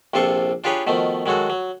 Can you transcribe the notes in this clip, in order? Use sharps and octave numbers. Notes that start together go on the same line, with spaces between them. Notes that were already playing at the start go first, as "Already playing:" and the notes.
A#1 C3 F4 A4 C5 C#6
D4 F4 G4 G#4 B4 C#5
B2 D#3 F3 A3
D#3 F#3 G#3 F#4 A4
F#3